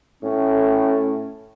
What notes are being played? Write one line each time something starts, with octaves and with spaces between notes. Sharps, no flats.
A2 C#4